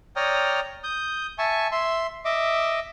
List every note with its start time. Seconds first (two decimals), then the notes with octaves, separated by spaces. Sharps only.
0.16 C#5 D5 G5 A#5 D#6 F6
0.84 D#6 G6
1.38 E5 G#5 A5 C#6
1.72 E5 C6
2.25 D#5 E5 D6